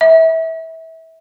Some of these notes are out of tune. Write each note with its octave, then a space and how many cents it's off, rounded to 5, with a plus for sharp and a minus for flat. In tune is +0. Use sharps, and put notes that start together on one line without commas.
E5 -25